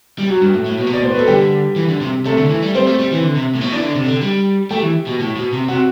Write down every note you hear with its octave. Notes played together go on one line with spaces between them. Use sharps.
G3
F#3 F#4
G2
A2
A2
B2
C3
B2 D5
A2 C5
B4
B2 A4
D3 G3 G4
E3
D3
C3
C3 A3 A4
D3
E3
G3
G3 C4 C5
A3
G3
E3
D3
C3
A2
B2
E3 D4 D5
D3
C3
D3
G3
A3 G4 G5
E3
B2
A2
B2
C3
C3 F#4 F#5